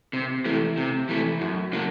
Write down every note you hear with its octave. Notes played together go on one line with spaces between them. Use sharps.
C3
E3 A3
C3
E3 A3
F#2
C#3 F#3 A#3